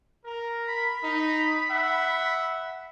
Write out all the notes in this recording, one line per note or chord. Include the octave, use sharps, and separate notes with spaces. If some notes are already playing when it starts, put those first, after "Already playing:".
A#4
B5
D#4
E5 F#5